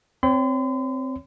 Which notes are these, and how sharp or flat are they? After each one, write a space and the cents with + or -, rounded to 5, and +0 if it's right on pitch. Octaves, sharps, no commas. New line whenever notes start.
C4 +0 C#5 +20 C6 -45